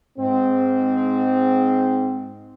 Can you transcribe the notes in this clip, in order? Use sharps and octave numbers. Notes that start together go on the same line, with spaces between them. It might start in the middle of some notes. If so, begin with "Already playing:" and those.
G#2 C4